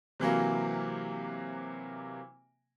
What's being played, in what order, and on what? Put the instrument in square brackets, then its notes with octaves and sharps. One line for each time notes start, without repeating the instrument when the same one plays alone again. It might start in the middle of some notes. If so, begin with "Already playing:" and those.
[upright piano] C3 E3 F#3 A#3